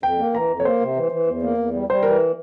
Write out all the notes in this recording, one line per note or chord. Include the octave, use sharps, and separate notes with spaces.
F2 G5
A#3
E3 A#5
F2
C#5
A#3 C5
C3
E3
E3
E2
A#3
E2
G3
G3 C5
E3 A#4